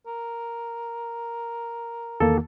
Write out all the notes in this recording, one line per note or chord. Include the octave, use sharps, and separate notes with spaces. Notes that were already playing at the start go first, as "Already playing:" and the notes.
A#4
E2 D#3 A#3 A4